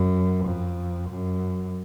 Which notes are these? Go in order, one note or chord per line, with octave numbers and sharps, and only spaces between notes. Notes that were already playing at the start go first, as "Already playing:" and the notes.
Already playing: F#2
F2
F#2